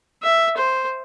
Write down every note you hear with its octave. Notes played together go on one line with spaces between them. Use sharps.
E5
C5